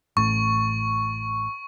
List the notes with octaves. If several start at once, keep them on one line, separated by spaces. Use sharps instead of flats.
A1 A2 C#6